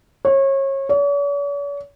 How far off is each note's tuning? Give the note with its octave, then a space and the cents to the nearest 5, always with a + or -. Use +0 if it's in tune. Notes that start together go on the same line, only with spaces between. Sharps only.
C#5 -30
C#5 +45